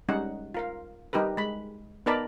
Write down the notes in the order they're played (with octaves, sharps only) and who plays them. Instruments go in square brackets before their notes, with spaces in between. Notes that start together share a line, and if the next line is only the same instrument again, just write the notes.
[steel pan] G3 G#3 C#4 D#4 F#5
F4 A#4 F5
G3 D#4 G4 A#4 B4
G#3 B5
B3 D#4 A#4 D5 A5 B5